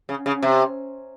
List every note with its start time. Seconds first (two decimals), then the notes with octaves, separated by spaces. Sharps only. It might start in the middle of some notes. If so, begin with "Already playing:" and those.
0.09 C#3
0.26 C#3
0.43 C3